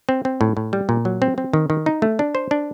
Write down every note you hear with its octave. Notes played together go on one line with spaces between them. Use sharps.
C4
C4
A2
A2
G3
A#2
F#3
C4
C4
D#3
D#3
D#4
A3
D4
C5
D4